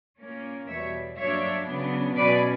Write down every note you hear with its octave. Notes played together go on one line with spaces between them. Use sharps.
A#2 A#3 C#4
E2 B2 G3 C#5 E5
G2 F#3 A#3 D4 C#5 E5
C#3 F#3 B3 D4
B2 F#3 C#4 B4 D5